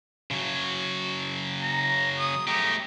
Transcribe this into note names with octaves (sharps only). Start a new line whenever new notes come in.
C#3 F#3
A#5
D#6
A3 G4 A#5